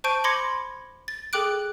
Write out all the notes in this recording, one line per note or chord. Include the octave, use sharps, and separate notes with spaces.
C5 A5 C#6 G6 D7 D#7
B5 C6 D6 G#6 A#6 C#7
A6
G#4 A4 G5 D6 F#6 D7